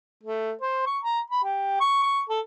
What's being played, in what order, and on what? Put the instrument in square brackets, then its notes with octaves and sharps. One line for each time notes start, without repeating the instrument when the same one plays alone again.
[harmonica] A3
C5
C#6
A#5
B5
G4
C#6
C#6
A4